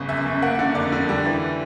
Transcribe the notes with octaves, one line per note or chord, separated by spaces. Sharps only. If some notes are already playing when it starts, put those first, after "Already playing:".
Already playing: G1 C#3
F#2 E5
F#2
A#3 F#5
D3
F2 D5
D3
G3
E3